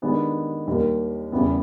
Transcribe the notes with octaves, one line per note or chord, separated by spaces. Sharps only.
D#3 G#3 B3 D4 G4
D#2 D#3 G3 A#3
E2 C#3 E3 G3 B3